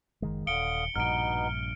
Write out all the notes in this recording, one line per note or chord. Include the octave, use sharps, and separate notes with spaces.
F#1 D#3 G#3
D#1 D3 F5 D#6 C#7 D7 G7
A#1 G2 B2 B3 D#4 F6 D7